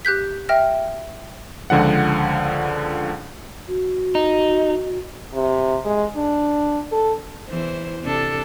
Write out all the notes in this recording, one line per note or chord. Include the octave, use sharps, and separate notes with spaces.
G4 F#6 G6 B6
E5 G5 F6 A#6
C#2 D3 F3 F#5
F#4
D#4
C3
G#3
D4
A4
E2 E3 C5
C3 D4 A4